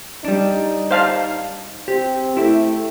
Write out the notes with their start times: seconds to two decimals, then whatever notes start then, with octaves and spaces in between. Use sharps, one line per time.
0.25 G3 D4 D#4
0.91 C5 F5 A5
1.88 C4 G4
2.37 A3 E4 G4 E5